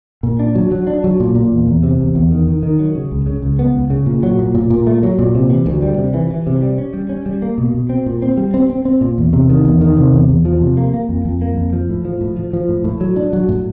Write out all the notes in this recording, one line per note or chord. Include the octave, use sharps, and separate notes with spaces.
A#2
D4
F#3
F#3
D4
F#3
A#2
A#2
E2
E2
C3
E2
E2
D#3
D#3
D#3
F#3
C#3
C#2
C#3
C#2
B3
C#2
C#3
A#2
F#3
A#2
A#2
A#2
A3
F#3
A#2
C3
E3
D2
G3
C3
E3
E3
C3
G3
C#4
G3
C#4
G3
A#3
B2
B2
C4
A#2
C4
G3
C4
C4
C4
A#2
E2
C3
D#3
E2
D#3
C3
E2
E2
F3
C3
A#3
A#3
F2
F2
A#3
F2
F3
A2
F3
A2
F3
F3
A2
A2
F#3
D4
F#3
A2